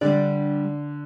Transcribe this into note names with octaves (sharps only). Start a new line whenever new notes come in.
D3 G3 D4 G4 D5